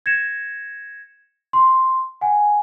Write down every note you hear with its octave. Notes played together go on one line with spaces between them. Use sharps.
G#6 A#6 C#7 E7
C6
F#5 G#5